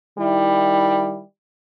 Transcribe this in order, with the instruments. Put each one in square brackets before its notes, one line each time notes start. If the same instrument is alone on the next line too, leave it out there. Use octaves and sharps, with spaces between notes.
[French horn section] D#3 G3 E4